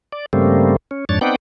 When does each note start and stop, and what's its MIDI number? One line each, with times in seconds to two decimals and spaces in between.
0.12 0.26 74
0.33 0.76 43
0.33 0.76 49
0.33 0.76 55
0.33 0.76 57
0.33 0.76 58
0.33 0.76 60
0.91 1.05 61
1.09 1.19 41
1.09 1.19 44
1.09 1.19 62
1.09 1.19 73
1.09 1.19 93
1.21 1.36 59
1.21 1.36 60
1.21 1.36 63
1.21 1.36 74
1.21 1.36 78
1.21 1.36 79